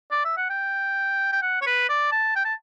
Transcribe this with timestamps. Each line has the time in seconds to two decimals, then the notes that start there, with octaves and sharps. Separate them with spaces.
0.11 D5
0.25 E5
0.37 F#5
0.50 G5
1.32 G5
1.42 F#5
1.62 C#5
1.67 B4
1.89 D5
2.12 A5
2.36 G5
2.45 A5